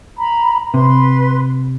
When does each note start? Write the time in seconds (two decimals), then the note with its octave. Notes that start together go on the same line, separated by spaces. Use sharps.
0.18 A#5 B5
0.74 C3 B4 C6